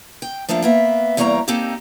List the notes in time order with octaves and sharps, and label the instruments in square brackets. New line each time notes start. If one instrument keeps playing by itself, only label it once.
[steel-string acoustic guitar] G5
F3 A3 A#3 D4 F4
A#3 B3 E5
E2 G3 A#3 C#5 A5 A#5
A#3 C4 D#4 G4 A4